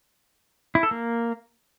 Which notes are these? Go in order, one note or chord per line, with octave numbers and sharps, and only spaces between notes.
E4
A4
A#3